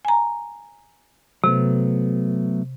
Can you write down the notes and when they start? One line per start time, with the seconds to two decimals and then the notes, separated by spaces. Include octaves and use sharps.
0.05 G#5 A#5
1.44 C3 F#3 A3 B3